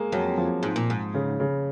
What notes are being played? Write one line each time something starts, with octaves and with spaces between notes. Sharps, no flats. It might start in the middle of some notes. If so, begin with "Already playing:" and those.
Already playing: G#3 A#3
F2 F#3
F3
G#2
A#2
G#2
C#3
C#3